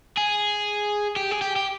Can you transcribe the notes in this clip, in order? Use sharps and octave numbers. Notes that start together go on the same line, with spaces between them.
G#4
G4
G#4
G4
G4